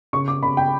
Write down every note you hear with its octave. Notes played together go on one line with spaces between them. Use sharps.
C#3 C#6
D6
C#3 B5
G5